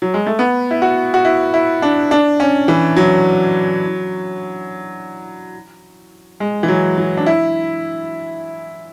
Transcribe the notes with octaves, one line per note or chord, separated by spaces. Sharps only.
F#3
G#3
A3
B3
E4
F#4
F#4
E4
E4
D4
D4
C#4
E3
F#3
G#3
E3
F#3
F#3
D4
E4